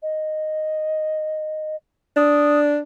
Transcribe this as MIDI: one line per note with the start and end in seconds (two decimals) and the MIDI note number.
0.02 1.75 75
2.16 2.79 62
2.16 2.59 87